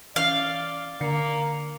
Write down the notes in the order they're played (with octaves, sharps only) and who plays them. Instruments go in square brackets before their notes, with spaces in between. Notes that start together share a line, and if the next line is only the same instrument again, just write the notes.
[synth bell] E3 C#4 G7 [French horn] D5 [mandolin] F5
[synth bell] D3 C7 C#7 [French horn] A#3